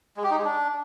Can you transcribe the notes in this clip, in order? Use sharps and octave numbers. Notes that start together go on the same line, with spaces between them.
G#3
G4
D#4
G#3
D4